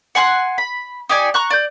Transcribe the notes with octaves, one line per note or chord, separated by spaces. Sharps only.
F#5 G#5 C6 F#6
B5
D#4 G4 D5 G#5
A#5 C#6 F#6
D5 G6